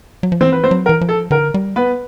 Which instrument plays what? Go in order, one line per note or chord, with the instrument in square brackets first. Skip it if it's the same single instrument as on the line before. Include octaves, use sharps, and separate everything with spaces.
[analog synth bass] F#3
F3
[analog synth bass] E3 [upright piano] C4 C5
[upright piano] B4
C4 C5
[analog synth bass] F#3
[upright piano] A#4
[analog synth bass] E3
F3
[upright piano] A4
[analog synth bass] D3 [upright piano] A#4
[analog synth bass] G3
[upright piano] B3 B4